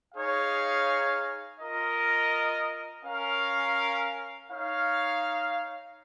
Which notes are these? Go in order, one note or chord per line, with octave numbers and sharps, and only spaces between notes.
D#4 G#4 C#5 F5
F4 A#4 D#5
C#4 A#4 F5
D#4 C#5 F5